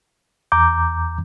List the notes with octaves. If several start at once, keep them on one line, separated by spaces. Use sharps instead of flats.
E2 A#5 D6 G6